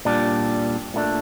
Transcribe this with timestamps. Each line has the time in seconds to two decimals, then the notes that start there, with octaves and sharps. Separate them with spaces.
0.05 A#2 G3 D4
0.94 A#2 A3 D4